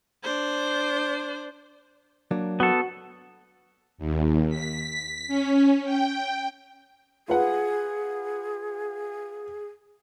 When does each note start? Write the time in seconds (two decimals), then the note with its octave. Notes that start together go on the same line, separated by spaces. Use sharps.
0.23 D4 C5
2.31 F#3 A#3 D4
2.60 B3 F#4 A4
3.98 D#2
4.49 B6
5.28 C#4
5.84 G5
7.28 F4 G#4 B4 F#5